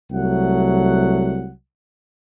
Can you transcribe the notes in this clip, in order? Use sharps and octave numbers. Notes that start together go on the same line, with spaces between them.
C2 F#3 A3 F#5